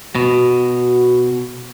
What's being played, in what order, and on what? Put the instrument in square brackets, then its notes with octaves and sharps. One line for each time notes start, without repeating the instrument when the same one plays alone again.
[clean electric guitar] B2 [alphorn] F#4